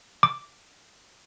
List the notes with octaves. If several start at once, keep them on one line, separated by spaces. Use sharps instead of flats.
D6